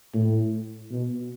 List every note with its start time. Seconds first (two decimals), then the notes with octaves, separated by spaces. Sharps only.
0.14 A2
0.91 B2